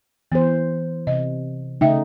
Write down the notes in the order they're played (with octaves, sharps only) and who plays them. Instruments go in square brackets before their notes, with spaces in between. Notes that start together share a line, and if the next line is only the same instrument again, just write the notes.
[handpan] E3 C5 [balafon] B3
[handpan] C3 [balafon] D#5
[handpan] C#3 A3 D#4 [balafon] E5 G5